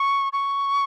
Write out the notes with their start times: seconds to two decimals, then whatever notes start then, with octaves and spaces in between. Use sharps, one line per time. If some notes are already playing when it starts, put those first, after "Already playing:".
Already playing: C#6
0.33 C#6